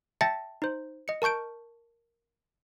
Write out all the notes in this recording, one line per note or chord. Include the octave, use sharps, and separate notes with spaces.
E5 G5 A5 A6 A#6 C#7
D#4 C5
D#5 C#7
A#4 A5 C#6 G6 D7